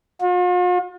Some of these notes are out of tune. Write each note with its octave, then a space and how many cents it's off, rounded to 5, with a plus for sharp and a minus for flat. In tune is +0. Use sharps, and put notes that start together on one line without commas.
F4 +45